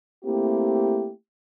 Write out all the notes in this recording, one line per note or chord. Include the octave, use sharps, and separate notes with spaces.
A3 A#3 C4 E4 G4